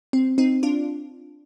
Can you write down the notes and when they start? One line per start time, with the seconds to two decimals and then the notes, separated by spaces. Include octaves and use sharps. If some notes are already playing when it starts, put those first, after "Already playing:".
0.13 C4
0.38 C4 D#4
0.63 D4 F4